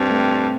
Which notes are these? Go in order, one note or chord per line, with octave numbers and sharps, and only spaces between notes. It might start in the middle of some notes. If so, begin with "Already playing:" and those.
Already playing: G2 C4
A3